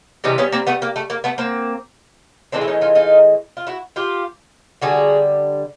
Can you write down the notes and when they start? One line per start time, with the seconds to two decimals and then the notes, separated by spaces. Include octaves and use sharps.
0.24 C3 E3 G3 C#4 D#4
0.38 B3 C#4
0.52 A#3 C4
0.67 A3 B3
0.82 A#3
0.96 A3
1.10 A#3
1.24 A3 B3
1.38 A#3 C4
2.52 A2 E3 G#3 C4 D4
2.61 E4
2.68 C#4 D#4
2.81 D#4 F4
2.95 D#4 F4
3.57 F4
3.67 E4 F#4
3.96 F4 G4
4.81 D3 G3 F#4 G#4